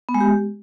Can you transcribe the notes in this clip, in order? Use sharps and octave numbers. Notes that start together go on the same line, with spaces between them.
B3
G#3
G4